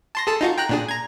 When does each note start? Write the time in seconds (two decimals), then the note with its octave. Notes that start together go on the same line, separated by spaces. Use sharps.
0.15 A5 C6 A#6
0.27 G#4 A4 A5
0.41 D#4 F4 F#4
0.58 G5 A#5 F#6
0.69 A#2 D4 G#4
0.89 A#5 G#6